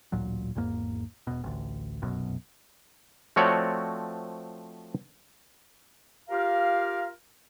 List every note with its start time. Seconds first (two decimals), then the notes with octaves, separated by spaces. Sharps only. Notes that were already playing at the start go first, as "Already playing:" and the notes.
0.12 A1 D2 A#2 F#3
0.55 G#1 E2 G#2 A#3
1.27 E1 B2
1.43 A1 D2
2.02 F1 B1 F#2 B2
3.36 F3 A3 C4 F#4 C#5 D5
6.29 F4 G4 A#4 F5